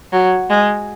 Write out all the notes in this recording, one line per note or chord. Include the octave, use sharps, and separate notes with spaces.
F#3
G#3